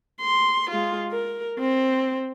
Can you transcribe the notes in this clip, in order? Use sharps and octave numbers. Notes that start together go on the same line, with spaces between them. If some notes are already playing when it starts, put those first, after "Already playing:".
C6
G#3 F4
A#4
C4